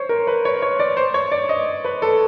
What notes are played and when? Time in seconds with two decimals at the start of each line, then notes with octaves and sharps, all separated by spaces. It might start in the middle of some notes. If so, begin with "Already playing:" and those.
Already playing: C5 C#5
0.09 A#4
0.27 B4
0.45 C#5
0.62 C#5
0.80 D5
0.97 C5
1.14 C#5
1.32 D5
1.49 D#5
1.85 B4
2.02 A4